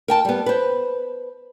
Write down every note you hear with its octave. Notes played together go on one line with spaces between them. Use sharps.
A#4 G5 A5
G3 B3
B4 C5